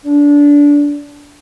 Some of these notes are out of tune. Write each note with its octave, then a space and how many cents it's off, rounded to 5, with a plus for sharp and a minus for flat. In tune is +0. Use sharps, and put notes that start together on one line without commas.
D4 -20